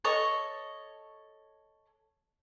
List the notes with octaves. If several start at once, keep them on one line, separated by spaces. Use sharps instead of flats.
A4 C#5 D#5 C#6